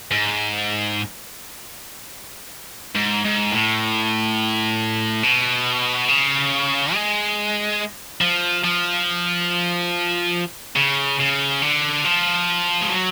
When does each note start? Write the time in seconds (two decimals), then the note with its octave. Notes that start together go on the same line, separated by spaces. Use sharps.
0.11 G#2
2.95 G#2
3.25 G#2
3.52 A2
5.23 B2
6.08 C#3
6.94 G#3
8.21 F3
8.64 F3
10.76 C#3
11.19 C#3
11.62 D3
12.05 F3
12.81 G#3
12.90 F#3